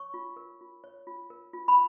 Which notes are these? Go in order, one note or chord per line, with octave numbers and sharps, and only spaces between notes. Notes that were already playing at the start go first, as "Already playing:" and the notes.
Already playing: C#5 C#6
F4
A#4
F4
C#5
F4
A#4
F4
B5